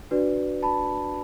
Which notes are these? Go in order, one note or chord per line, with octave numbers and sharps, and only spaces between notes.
D4 F#4 B4 D5
A5 B5